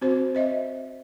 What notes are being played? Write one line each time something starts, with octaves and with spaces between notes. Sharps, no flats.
C4 F#4 C5
C5 D#5 E5